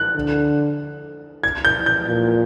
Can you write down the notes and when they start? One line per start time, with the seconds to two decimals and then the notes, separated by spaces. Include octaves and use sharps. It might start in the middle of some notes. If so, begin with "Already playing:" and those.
Already playing: F#6
0.16 D3
1.44 G#6
1.65 G6
1.86 G6
2.08 A#2